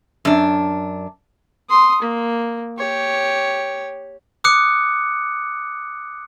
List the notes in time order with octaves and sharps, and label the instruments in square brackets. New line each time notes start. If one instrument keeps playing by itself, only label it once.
[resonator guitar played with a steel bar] F#2 D4
[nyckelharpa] C6 D#6
A#3
G4 C#5
[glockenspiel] D6 D#6 F#6 C#7